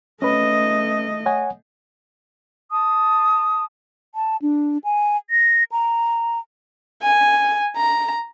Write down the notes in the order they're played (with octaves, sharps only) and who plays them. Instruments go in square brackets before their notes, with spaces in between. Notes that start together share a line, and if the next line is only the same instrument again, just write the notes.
[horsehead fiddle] A3 D#5 [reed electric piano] C#4 B4
[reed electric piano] C#5 F#5 G#5
[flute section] A5 D#6
[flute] A5
D4
G#5
A#6
A#5
[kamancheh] G#5
A#5